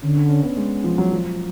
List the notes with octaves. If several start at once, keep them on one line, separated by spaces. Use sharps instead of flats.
D3 C#4
D4
C#4
B3
G#3
F3
F#3
F3